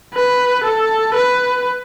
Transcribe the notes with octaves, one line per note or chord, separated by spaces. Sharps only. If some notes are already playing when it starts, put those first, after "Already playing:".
B4
A4
B4